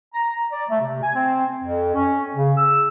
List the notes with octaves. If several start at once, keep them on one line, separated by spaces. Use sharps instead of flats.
A#5
D5
A3
C3
G#5
C4
F2
C#4
C#3
E6